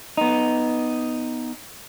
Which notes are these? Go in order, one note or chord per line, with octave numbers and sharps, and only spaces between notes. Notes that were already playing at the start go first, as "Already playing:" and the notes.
B3 D#4